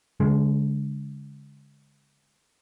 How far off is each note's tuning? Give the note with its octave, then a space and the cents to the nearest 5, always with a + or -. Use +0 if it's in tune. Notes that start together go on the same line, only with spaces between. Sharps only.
D3 -45 G#3 +0